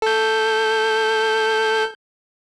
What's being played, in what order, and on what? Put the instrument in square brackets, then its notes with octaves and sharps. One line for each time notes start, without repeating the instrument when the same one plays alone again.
[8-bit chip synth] A4 G6